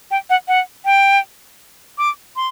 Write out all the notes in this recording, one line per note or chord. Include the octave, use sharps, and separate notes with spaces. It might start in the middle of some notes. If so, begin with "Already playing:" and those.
G5
F#5
F#5
G5
D6
C6